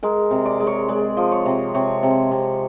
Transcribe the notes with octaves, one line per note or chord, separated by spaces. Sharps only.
G#3 A#4
C3
D5
G#3
C#5
G#3 D5
F3
C#5
C3
C3 C#5
C3
C3